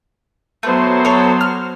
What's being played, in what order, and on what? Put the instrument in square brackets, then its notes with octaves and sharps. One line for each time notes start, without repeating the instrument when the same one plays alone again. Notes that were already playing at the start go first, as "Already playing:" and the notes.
[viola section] F#3 B3 C5 [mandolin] A3
[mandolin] A4 C#5
F6